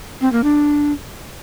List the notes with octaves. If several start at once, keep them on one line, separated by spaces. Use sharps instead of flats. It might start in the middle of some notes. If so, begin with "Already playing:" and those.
C4
A#3
D4